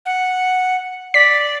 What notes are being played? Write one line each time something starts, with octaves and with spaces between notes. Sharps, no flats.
F#5
D5 B6